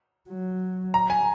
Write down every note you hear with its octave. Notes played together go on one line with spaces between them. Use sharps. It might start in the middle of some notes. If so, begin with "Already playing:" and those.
F#3
A#5
G#5